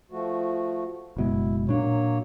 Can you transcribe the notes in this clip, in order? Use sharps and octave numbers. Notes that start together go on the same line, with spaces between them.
F3 A3 F#4
F#1 B2 G#3 E4
A#2 F#3 A#3 D4 C#5